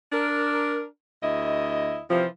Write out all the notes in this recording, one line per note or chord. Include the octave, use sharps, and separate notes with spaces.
D4 A#4
D2 E4 D#5
C3 E3 F3